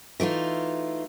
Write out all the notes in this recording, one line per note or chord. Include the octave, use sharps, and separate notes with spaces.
E3 A3 D#4 F4